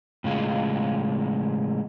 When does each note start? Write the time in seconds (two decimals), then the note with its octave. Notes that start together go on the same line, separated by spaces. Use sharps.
0.24 A2 C#3 G#3 F4